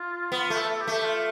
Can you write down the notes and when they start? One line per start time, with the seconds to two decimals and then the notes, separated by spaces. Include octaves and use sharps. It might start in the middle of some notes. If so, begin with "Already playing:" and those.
Already playing: F4
0.32 B3 F4
0.50 A3
0.57 A4
0.76 A4
0.81 G4
0.87 A3
1.05 F4